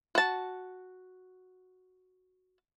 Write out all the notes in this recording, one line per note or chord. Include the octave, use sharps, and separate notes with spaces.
F#4 A5